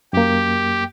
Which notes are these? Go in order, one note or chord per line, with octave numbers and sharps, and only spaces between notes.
F#2 A#3 G4